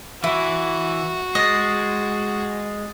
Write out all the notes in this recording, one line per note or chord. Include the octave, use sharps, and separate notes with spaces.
E3 E4 F#4
G#3 D#5 D#6 A6